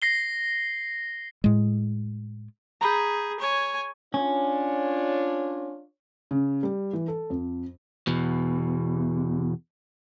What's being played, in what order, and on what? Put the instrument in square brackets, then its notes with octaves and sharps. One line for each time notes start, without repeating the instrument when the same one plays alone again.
[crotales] A#6 C7 G7
[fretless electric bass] A2 G#3
[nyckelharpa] G#4 [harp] A#5 B5 G6
[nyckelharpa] C#5 G#5
[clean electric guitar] C#4 [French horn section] D4 F4 C#5
[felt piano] C#3
G3
E3
A4
F2
[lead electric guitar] E2 B2